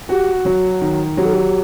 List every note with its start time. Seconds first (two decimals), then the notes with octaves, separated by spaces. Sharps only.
0.09 F#4 G4
0.45 F#3
0.81 D#3
1.17 F#3 G4
1.25 A4
1.33 G4